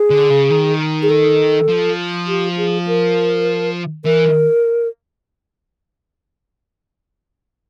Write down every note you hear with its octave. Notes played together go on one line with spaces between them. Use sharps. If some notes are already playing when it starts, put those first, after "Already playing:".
Already playing: G#4
D3
C#3
D#3
G#4
A4
F3
G4
G#4
A#4
E3 A#4